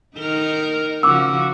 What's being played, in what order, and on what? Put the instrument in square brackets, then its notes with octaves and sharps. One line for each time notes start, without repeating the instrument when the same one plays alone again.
[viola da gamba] D#3 D#4 A#4
[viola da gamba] C#3 F3 F#4 [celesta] D6 E6